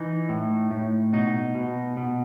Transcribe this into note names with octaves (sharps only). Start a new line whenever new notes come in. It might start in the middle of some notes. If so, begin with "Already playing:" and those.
Already playing: E3 D#4
A2
A2
B2 D#4
B2
B2